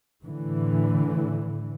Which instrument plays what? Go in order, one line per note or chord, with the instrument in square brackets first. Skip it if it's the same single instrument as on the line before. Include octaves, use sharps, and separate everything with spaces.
[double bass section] A2 D3 E3